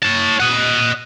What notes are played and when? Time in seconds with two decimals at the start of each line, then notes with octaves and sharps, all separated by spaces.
0.02 C#5 A5
0.40 D#5 F#5